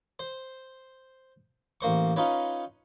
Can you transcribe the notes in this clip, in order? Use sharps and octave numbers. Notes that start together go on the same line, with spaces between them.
C5
A1 A#3 C5 C#6
C#4 D#4 F4 B4 C#5